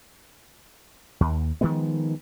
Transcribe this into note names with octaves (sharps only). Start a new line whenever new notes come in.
D#2
D#3 F3 G#3 B3